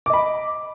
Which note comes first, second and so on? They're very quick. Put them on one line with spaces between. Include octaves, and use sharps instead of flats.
D6 D#5 B5